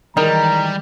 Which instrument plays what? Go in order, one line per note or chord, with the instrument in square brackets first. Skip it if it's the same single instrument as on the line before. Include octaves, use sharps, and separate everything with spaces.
[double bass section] D#3 E3 G#3 [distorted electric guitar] G3 [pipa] D#4 A#4 [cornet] A#5